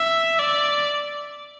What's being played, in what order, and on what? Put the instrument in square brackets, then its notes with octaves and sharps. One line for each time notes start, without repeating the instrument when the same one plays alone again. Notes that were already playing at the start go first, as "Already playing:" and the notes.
Already playing: [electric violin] E5
D5